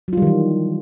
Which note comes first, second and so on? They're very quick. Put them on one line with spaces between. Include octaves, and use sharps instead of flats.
F#3 F4 G3 D#3 E3